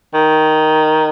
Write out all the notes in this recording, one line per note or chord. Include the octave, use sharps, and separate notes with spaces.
D#3